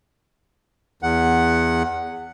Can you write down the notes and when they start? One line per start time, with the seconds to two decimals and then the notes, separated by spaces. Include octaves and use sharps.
1.03 E2 F#5